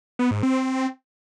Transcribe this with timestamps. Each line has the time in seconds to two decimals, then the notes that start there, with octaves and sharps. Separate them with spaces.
0.19 B3
0.31 G#2
0.43 C4